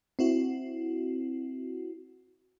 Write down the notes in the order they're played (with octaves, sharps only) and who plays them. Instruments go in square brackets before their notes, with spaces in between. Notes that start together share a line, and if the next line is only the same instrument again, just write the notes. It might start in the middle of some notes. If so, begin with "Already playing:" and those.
[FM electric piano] C4 E4 F#4